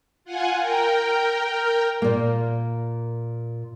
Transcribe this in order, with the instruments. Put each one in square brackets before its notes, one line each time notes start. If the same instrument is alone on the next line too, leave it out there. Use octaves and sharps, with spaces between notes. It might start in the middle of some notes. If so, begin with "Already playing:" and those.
[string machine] F4 F#5 G#5
A#4 G5
[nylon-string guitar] A#2 A#3